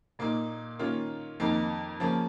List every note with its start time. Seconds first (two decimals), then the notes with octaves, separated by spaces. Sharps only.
0.19 A#2 A#3 D#4
0.79 D#3 A#3 C#4 F4
1.40 F2 D#3 A#3 D#4
2.00 C#3 F3 A#3 C#4